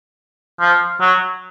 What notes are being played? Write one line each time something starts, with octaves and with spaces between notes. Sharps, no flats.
F3
F#3